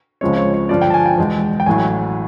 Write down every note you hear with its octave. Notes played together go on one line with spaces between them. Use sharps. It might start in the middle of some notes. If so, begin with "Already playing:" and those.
C#2 C#3 F3 G#3 C4 C#5
C#5
C#5
G2 D3 F3 D5
G5
A5
G#5
G5
E2 B2 G#3
G5
A1 A2 F#3 G#5